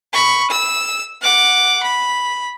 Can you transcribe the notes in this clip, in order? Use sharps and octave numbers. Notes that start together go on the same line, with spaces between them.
B5 C#6
E6
F#5 D6
B5